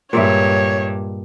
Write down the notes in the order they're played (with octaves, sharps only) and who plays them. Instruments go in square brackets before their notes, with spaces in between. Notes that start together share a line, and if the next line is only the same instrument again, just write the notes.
[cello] G2 [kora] A#2 G#3 E5 [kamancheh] C#5